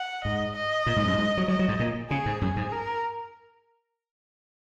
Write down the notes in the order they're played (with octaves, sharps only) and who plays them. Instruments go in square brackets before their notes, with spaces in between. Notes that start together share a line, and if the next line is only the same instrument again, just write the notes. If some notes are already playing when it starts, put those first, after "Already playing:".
Already playing: [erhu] F#5
[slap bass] G#2 [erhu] D#5
[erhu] D#5
[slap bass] A#2
G#2
F#2
G#2
F#3
[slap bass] F#3 [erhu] D#5
[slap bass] F#3
G#2
A#2
[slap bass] C#3 [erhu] G#4
[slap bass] G#2
[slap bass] F#2 [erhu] G#4
[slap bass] G#2
[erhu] A#4